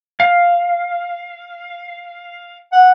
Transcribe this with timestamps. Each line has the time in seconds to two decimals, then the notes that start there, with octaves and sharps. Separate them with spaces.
0.20 F5
2.72 F#5